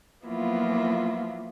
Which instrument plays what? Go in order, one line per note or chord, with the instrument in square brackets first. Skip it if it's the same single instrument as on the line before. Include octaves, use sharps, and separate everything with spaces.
[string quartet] F3 F#3 A#3 B3 E4 F4